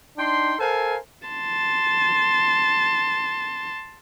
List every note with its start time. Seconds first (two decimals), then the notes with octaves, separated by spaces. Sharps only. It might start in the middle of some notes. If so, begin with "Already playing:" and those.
0.17 D4 D#4 G5 C6
0.60 A4 A#4 C5 F5 G#5
1.28 A5 C6